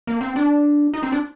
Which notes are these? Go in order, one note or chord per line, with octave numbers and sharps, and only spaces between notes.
A#3
C4
D4
D#4
C4
D4